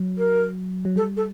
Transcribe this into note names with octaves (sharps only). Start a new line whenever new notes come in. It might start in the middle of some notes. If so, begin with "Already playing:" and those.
Already playing: F#3
A#4
F#3
G3 A4
A4